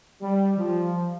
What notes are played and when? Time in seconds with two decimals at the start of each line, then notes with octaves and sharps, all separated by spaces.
0.21 G3
0.57 F3